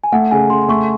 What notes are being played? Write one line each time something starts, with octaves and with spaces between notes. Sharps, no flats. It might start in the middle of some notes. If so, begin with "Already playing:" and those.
G#5
A3 F#5
C#3 G#5
C#3 C6
A3 C#6